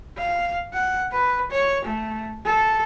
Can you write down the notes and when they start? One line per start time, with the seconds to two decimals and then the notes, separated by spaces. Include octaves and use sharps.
0.17 F5
0.73 F#5
1.12 B4
1.51 C#5
1.85 A3
2.46 A4